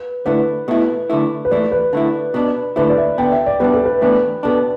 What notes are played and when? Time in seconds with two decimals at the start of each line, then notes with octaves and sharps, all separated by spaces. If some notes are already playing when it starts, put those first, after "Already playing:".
Already playing: B4
0.26 D3 A3 E4 B4
0.68 B2 A3 E4
1.10 D3 A3 E4
1.45 B4
1.51 E3 A3 E4 D5
1.72 B4
1.93 D3 A3 E4
2.34 B2 B3 D4
2.76 D3 A3 E4 B4
2.89 D5
2.97 E5
3.18 D3 B3 D4 G5
3.32 E5
3.46 D5
3.60 B2 G3 D4 B4
3.73 A4
3.86 B4
4.01 A2 E3 B3 D4 B4
4.43 B2 B3 D4 A4